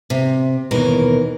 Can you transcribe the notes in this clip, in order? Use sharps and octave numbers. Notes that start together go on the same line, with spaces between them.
C3
D#2 B2 E3 A#4